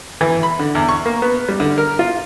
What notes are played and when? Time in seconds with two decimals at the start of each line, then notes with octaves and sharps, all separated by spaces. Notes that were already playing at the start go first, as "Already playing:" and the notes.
0.21 E3
0.43 B5
0.60 D3
0.75 E2
0.89 C#6
1.06 A#3
1.22 B3
1.49 G3
1.60 D3
1.78 A#4
1.99 F4